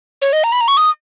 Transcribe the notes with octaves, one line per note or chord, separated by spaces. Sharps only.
C#5
D#5
A#5
B5
A#5
C#6
D#6